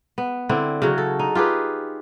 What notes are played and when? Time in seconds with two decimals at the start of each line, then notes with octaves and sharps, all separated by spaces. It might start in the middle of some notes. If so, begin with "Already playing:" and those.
0.18 B3
0.49 D3 C4 E4
0.82 C#3 F#3 F#4
0.98 A4
1.19 D#4
1.35 F4 G4 G#4 B4